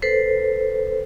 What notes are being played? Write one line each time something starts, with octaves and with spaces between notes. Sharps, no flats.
A4 B4 C5